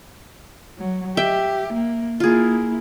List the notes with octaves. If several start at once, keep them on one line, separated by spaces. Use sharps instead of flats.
F#3
G4 E5 G5
A#3
A#3 E4 F4 G#4